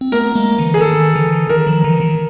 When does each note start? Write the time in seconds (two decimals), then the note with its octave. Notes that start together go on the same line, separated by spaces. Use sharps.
0.01 C4
0.12 A3 B3 A#4
0.35 G#3 A#3
0.59 D3 E3
0.74 G#4
0.81 D#3 A4
1.16 D3 E3
1.49 D#3 A#4
1.67 D#3 F3
1.84 D3 E3
2.01 D#3